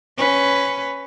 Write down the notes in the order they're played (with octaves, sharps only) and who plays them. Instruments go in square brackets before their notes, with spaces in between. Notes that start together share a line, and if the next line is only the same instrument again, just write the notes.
[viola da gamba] C#4 B4